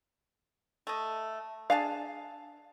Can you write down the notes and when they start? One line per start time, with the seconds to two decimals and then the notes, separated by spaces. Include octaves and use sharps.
0.87 A3 D#5
1.70 D4 G#4 F5 A5